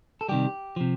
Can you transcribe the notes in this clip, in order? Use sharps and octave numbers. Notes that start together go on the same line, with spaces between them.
A4
C3 D#3 G3 G4
C3 F3